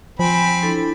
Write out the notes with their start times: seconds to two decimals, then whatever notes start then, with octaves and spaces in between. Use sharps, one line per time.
0.19 F3 C4 G#5 B5
0.62 D4 E4 A4